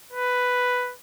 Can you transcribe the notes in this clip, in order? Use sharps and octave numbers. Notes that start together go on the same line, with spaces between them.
B4